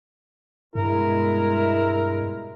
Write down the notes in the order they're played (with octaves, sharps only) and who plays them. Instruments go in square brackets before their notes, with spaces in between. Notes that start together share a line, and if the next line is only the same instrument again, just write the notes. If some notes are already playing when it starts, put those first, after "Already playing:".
[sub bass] G2 [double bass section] B2 G3 G#3 [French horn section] E4 [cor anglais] A#4